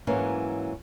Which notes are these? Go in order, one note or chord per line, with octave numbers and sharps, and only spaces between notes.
G#2 E3 F#3 A#3 C#4